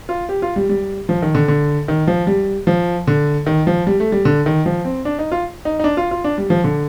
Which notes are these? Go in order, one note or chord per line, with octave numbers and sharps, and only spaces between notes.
F4
G4
F4
G3
G3
F3
D#3
D3
D3
D#3
F3
G3
F3
D3
D#3
F3
G3
A3
G3
D3
D#3
F3
C4
D4
D#4
F4
D#4
D#4
D4
F4
F4
D4
G3
F3
D3